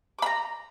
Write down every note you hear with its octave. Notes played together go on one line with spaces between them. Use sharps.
A#5 B5 D6